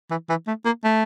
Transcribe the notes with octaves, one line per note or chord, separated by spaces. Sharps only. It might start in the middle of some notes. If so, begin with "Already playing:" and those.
E3
E3
A3
A#3
A3